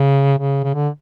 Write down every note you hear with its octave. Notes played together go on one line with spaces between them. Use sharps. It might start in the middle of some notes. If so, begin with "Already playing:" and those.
Already playing: C#3
C#3
C#3
D3